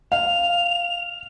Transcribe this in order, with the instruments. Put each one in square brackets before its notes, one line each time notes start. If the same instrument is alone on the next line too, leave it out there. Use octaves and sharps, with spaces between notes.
[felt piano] F5 [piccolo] F7